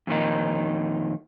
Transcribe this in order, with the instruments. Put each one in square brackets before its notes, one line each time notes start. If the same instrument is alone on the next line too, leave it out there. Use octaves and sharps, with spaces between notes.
[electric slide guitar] F2 A#2 D#3 D#4